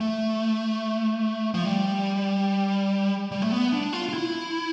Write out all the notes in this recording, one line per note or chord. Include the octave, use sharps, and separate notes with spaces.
A3
F3
G3
G3
A3
B3
D4
F4
F4
E4